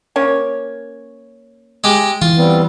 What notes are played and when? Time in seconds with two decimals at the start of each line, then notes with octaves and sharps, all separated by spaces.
0.16 A#3 C#4 C#5
1.84 G#3 G4
2.22 E3 F4
2.37 G3 B3 C4